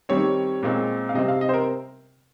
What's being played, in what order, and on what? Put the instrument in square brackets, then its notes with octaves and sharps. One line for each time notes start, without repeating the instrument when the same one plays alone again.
[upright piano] D#3 G3 C4 C#5
A#2 G#3 C4
F5
C3 G3 C4 D#5
F5
D#5
C5
A#4